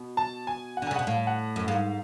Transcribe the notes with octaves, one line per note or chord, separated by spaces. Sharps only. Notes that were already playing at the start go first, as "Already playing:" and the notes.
Already playing: B2
A5
G#5
F#5
D3
C#3 G#5
B2 F#5
A2 F5
F#5
F#2
G#2 F5